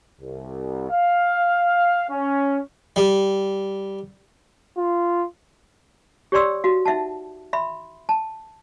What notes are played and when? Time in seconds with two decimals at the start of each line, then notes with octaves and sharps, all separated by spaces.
0.20 C2
0.90 F5
2.09 C#4
2.96 G3
4.77 F4
6.32 G4 C#5 D5 G5 C6 E6
6.64 F#4 F5
6.85 D#4 E5 F#5 A5
7.53 E5 B5 C6
8.09 A5